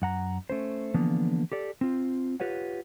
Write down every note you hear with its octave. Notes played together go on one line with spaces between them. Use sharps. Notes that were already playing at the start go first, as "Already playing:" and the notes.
F#2 F#5 A#5
A3 C#4 C5
D3 E3 F3 A#3 B3 D4
G4 A4 D5
C4 F4
F4 G4 B4 C#5 F#5